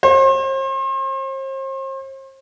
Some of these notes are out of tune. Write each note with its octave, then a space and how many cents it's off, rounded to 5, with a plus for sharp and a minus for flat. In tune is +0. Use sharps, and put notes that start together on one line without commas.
C5 +40